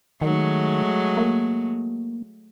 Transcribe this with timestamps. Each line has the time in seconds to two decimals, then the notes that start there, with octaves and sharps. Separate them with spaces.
0.21 D#3 F#3 G#3 A3
1.17 A#3